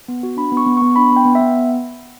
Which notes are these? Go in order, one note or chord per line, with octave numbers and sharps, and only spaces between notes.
B3
F#4
D4 B5
B3
C#6
B3
C#6
B3
D4 B5
B3
G5
B3
E5
B3